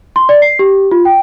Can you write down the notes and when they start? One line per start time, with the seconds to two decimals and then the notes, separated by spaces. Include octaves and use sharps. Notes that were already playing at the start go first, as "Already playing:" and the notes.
0.16 C6
0.29 D5
0.42 C7
0.59 G4
0.91 F4
1.05 G5